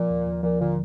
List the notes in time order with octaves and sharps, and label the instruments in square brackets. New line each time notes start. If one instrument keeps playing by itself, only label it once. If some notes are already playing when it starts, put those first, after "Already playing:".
Already playing: [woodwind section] A#2 [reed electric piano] F3
[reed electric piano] D#2
D#2
[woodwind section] A#2 [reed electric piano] F3
[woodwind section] A#2 [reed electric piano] D3